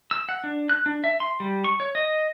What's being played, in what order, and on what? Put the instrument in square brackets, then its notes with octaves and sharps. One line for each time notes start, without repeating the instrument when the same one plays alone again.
[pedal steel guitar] E6
F#5
D4
F#6
D4
E5
C6
G3
C#6
C#5
D#5